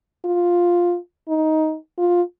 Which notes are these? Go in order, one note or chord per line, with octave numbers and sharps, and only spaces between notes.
F4
D#4
F4